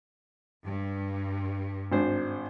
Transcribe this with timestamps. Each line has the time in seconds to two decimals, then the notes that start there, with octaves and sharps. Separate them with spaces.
0.66 G2
1.92 G#1 D4 C5